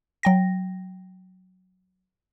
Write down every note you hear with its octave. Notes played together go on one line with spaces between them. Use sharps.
F#3 G5 A#6